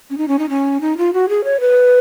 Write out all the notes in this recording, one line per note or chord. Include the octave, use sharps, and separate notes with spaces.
C#4
D#4
C#4
D#4
C#4
D#4
F4
F#4
G#4
C#5
B4